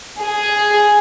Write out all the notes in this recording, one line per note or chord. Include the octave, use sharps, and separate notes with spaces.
G#4